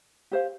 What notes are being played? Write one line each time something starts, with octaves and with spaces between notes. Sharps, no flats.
G4 C5 F5